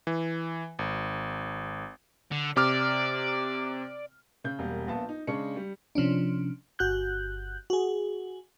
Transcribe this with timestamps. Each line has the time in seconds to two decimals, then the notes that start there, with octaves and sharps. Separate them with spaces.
0.07 E3
0.79 G#1
2.32 D3
2.57 C3 D5 D6 F6
4.44 C#3 G6
4.59 E1 G3 A#3
4.87 A#1 B3 F4 A5
5.09 D#4
5.27 C#3 G#3 D4 C#6 C#7
5.56 G3
5.95 C3 F3 C#4 D4
6.79 G1 F#4 F#6 G6
7.70 F#4 G#4